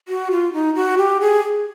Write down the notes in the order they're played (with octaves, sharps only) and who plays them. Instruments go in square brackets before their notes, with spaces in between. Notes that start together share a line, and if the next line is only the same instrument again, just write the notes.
[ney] F#4
F4
D#4
F#4
G4
G#4